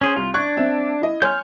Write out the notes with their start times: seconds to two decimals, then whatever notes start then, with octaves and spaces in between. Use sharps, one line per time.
0.01 C#4 G#4 C5
0.16 C2 F4
0.34 D4 C#6 F#6 G#6
0.57 C4 E5
1.02 E4 D#5
1.22 C#5 G#5 C6 F6 G6